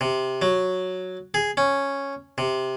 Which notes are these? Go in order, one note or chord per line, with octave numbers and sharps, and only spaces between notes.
C3
F#3
G#4
C#4
C3